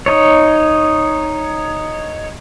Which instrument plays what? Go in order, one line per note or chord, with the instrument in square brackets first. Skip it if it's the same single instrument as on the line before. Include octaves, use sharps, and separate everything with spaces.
[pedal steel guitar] D#4 C#5